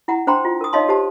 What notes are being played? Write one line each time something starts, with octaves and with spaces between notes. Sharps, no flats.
E4 F#5 A#5
D4 C5 G5 A#5 C6
F4
A#4 D#6
D#4 C#5 D#5 F5 A5 C6
G4 C5 A5